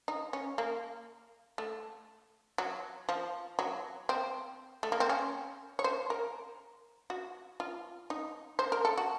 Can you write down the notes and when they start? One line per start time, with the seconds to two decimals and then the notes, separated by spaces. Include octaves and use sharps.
0.08 D#4
0.33 C#4
0.58 A#3
1.58 A3
2.58 F#3
3.09 F3
3.59 F#3
4.09 C4
4.83 A3
4.92 A#3
5.00 C4
5.09 C#4
5.79 C#5
5.84 C5
6.10 A#4
7.10 F#4
7.60 F4
8.10 D#4
8.59 C5
8.72 A#4
8.85 A4
8.97 F#4